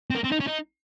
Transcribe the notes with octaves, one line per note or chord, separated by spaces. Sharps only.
C4
A#3
C4
D#4
C#4
D#4